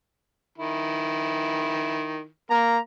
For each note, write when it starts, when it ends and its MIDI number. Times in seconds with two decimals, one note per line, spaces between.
0.58 2.27 51
0.58 2.27 64
2.50 2.79 58
2.50 2.73 70
2.50 2.78 82